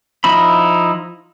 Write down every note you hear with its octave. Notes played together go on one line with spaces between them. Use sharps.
F3 D#4 E4 B5